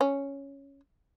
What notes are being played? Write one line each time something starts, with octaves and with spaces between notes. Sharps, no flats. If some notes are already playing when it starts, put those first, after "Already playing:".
C#4